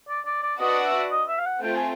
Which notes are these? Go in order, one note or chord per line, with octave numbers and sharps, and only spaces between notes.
D5
D5
D5
D4 F#4 B4 D5 D#5 F#5
E5
D#5
E5
F5
F#5
A3 C4 F4 G5
G#5